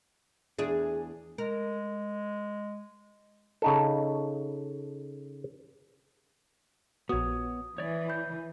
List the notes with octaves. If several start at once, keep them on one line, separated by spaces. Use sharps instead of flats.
E2 D4 G#4
G#3 A#4
C#3 D#4 A4
A#1 B3 F#4 C#5 D#6
E3 C#5 D5
B5 G6